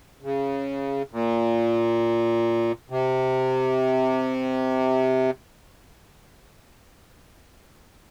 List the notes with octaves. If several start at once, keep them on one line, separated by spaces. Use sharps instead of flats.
C#3
A#2
C3